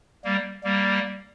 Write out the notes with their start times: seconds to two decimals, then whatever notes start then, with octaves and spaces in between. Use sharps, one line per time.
0.25 G3 A#3
0.64 G3 A#3